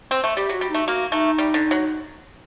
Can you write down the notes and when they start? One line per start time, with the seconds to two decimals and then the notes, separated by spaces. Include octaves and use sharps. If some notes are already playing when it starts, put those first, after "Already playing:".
0.11 C4
0.24 A3
0.37 G3 G4
0.49 F#3
0.53 F#4
0.61 G3
0.70 A3 D#4
0.87 A#3 F#4
1.12 A3 D#4
1.38 G3
1.54 D3
1.71 F#3